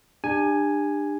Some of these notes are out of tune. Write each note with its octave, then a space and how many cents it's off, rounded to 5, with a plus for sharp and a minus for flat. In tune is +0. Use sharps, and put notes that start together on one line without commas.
D4 +30 G4 +30 G#5 +0